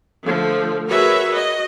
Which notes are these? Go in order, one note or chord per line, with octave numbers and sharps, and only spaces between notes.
D3 F3 A3
F#4 G#4 A#4 B4 C#5 E5
F#4 D#5